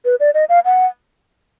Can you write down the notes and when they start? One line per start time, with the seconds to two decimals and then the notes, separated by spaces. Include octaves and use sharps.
0.05 B4
0.20 D5
0.34 D#5
0.49 F5
0.65 F#5